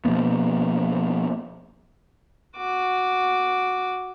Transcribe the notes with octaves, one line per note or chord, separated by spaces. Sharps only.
B2 F3 A#3 B3
F#4 D6